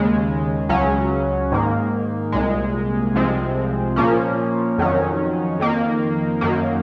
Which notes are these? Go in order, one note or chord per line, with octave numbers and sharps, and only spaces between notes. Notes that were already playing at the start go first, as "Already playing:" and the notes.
Already playing: D#2 C#3 G#3
C#2 C#3 F#3 C#4
G#2 D#3 A#3
C2 A#2 G#3
C2 C3 F3 G#3 C4
A#2 F3 A#3 C#4
F2 D#3 F#3 C#4
F2 D#3 A#3
F#2 D#3 A#3